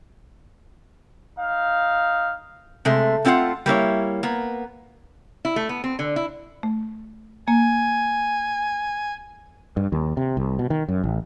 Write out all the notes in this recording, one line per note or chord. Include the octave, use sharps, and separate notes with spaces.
D#4 F5
C3 G#3 A3
A3 C4 F4 D#5 F#5
G3 A#3 E4 C#5
A#3 B3
E4
A3
B3
C4
D3
E4
A3
A#3 G#5
G2
D#2
C3
C2
B2
D#3
F#2
A1